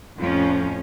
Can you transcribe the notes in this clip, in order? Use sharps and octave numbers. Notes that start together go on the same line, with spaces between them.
F2 A2 F3 C#4